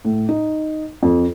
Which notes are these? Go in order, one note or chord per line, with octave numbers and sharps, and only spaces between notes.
A2
D#4
F2